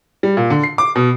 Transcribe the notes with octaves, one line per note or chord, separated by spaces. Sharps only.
G3
A#2
D3
C7
D6
B2